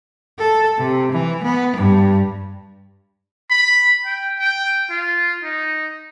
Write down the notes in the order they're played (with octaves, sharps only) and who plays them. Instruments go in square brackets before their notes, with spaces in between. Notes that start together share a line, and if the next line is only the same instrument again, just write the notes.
[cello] A4
C3
E3
B3
G2
[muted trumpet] B5
G5
G5
F4
D#4